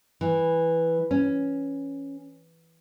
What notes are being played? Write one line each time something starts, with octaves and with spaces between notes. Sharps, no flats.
E3
C#4